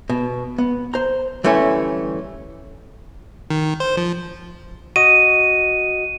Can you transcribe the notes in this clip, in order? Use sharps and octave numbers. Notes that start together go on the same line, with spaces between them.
B2
B3
C5 A#5
D3 E3 G3 A3 C#4
D#3
C5
F3
F#4 D#5 D#7